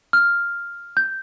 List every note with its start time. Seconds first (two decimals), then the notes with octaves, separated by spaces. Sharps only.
0.13 F6
0.97 G6